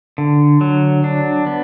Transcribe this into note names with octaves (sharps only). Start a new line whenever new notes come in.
D3
F#3
D4
B3